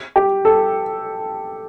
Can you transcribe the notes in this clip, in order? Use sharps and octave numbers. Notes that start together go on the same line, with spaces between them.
G4
A4